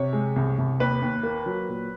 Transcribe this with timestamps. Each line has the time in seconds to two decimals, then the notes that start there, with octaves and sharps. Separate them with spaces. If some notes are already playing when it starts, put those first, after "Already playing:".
Already playing: C3 C#5
0.13 G#3
0.36 C2
0.58 C2
0.80 D#2 B4
1.02 D#2
1.23 A#3
1.46 F#3
1.69 A#2